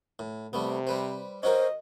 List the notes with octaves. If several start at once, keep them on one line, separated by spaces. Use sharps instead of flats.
A2
C3 G3 A3 B3
G3 B4 C5
C#4 F#4 A#4 C5 D#5